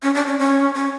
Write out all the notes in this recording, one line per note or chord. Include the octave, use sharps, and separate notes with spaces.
C#4
D4
C#4
C#4
C#4